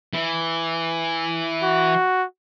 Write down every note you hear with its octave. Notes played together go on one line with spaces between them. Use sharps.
E3
F#4